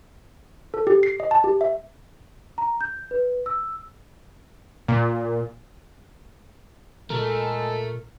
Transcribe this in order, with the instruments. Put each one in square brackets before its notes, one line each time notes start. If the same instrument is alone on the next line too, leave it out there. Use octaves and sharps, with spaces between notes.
[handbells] A4
G4
C7
D#5
A5
G4
E5
[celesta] A#5
G6
B4
E6
[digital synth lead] A#2
[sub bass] A#2 [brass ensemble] G#3 A4 [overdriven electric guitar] A3 [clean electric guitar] A#4